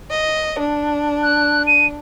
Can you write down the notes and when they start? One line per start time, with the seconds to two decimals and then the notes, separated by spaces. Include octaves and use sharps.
0.11 D#5
0.59 D4
1.23 F#6
1.67 D#7